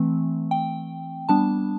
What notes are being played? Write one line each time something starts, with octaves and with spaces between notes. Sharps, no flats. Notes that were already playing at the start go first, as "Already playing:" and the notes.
Already playing: E3 A3 C4
G5
G3 B3 D4 A5